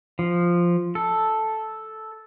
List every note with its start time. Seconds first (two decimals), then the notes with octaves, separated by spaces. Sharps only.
0.19 F3
0.95 A4